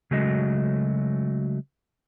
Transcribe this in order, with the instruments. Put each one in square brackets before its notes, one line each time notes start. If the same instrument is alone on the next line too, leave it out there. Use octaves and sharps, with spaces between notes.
[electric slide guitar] C#3 F#3 G#3 A3 F#4 D#5